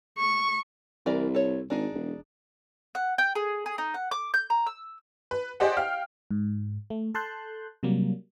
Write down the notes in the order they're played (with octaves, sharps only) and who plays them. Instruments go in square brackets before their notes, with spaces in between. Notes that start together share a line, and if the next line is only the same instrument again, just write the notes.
[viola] C#6
[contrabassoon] C2 [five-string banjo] E3 A#4 D5
[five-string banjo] A4 C#5
[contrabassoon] G#1 [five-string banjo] D4 D#4 G#4
[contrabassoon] E1
[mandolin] F#5
G5
G#4
G#4
D#4
F#5
D6
G6
A#5
E6
[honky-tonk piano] B4
G4 G#4 C5 D5 D#5 F#5
F5 G5 F6
[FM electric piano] G#2
A3
A4 A5 C6 F#6 G6
C3 F#3 G3 A#3